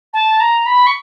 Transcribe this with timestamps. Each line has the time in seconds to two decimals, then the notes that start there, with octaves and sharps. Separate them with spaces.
0.13 A5
0.40 A#5
0.66 B5
0.86 C#6